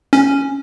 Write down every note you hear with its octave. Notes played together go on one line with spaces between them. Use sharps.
C#4